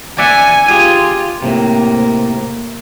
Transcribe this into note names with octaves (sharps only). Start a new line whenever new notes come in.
D5 E5 F#5 G#5
F4 G4 G#4 G#5
A2 C3 A#3